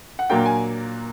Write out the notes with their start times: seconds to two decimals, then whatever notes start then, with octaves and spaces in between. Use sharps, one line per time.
0.19 F#5
0.30 A#2 F#3 A#3 D4 G5
0.46 G#5